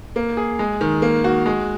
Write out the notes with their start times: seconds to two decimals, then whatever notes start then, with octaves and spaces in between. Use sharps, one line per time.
0.16 A#3
0.37 G#4
0.59 G#3
0.81 D#3
1.02 A#3
1.24 F#4
1.46 G#3